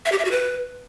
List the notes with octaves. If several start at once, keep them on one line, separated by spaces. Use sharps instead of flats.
E5
G4
E5
F#4
B4